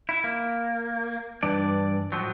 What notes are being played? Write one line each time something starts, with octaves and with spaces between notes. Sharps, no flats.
E4
A#3
G2 E3 D4 D5
A2 F3 F#3